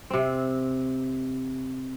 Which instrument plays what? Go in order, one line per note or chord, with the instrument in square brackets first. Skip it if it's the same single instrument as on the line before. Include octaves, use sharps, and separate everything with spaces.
[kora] C3 C4